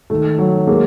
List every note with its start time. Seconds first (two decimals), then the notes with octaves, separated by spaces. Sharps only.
0.10 D#3 A3
0.38 F#3
0.67 G#3 A#3